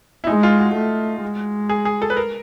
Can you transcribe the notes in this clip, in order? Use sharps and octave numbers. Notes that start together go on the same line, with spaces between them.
E4
G#3 D#4
F4
F#4
A3
G#3
G#4
G#4
A4
B4
A#4